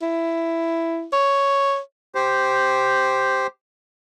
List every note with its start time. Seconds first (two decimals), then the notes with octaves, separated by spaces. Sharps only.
0.02 E4
1.13 C#5
2.15 G4 C5